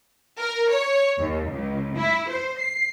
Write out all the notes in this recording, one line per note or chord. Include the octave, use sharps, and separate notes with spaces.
A#4
C#5
D#2
C#2
E4
C5
C7